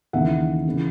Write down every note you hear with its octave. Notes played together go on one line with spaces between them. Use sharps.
D#2 C#3 E3 E5 F#5
C#3 E3